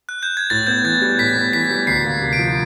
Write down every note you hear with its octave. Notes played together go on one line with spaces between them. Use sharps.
F#6
G6
G#6
A2 A6
B3 G6
E3 G#6
G3
A2 B6
B3
E3 B6
G3
D2 C7
A#3
C3
D7
F3